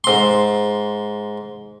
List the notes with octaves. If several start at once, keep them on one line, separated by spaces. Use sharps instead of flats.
G#2 C6